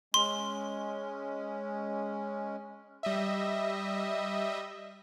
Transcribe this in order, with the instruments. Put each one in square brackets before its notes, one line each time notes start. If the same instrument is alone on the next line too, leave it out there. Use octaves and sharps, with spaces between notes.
[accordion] G#3 C#4 [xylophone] C6
[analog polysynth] G3 D#5 E5